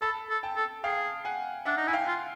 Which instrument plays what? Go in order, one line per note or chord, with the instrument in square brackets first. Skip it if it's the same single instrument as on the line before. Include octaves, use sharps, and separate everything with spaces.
[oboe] A4 [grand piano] A5 B5
[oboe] A4
[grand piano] G5 A5
[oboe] A4
[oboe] G#4 [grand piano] F5 G5
[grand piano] F#5 G#5
[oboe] D4 [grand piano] E5 F#5
[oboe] D#4
[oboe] E4 [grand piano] G#5
[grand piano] F5 G5
[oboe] F4